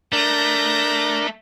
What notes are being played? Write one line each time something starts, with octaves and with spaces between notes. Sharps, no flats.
A3 D4 A#4 G6 A#6